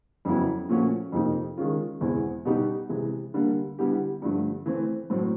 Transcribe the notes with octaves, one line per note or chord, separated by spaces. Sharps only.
F2 C#3 F#3 B3 E4
A#2 F3 A3 C#4 F#4
F2 C3 F3 A#3 D#4
D#3 G#3 C#4 F4
E2 B2 G#3 C4 E4
B2 G3 B3 D#4 G4
C3 E3 G#3
D3 G3 A#3
D3 G3 B3 E4 G4
G2 D3 F3 A3
E3 A3 C4
A2 F#3 A3 C4